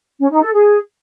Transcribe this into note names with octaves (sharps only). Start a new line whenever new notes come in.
C#4
D#4
A4
G#4